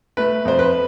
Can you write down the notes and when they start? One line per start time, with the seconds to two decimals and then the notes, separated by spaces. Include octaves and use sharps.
0.17 A3 B4
0.45 F2 C5
0.59 B4